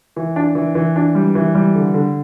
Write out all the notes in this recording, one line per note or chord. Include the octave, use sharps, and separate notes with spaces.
E3
D4
E3
E3
D4
G3
E3
G3
D3
D3